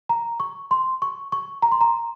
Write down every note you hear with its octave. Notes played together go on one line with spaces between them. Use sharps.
A#5
C#6
C6
C#6
C#6
A#5
C6
A#5